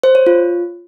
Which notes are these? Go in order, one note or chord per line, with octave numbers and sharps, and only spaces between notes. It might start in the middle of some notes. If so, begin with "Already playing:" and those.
C5
C#5
F4